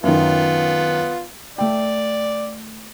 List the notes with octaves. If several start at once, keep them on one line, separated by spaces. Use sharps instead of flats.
F#2 D#3 B3 F4
A3 D5 G5